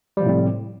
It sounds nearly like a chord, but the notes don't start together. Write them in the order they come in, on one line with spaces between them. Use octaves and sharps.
G3 F3 C3 A2 C4